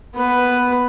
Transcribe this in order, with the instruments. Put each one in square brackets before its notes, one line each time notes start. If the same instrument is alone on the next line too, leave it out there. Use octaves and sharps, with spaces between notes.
[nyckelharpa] B3 B4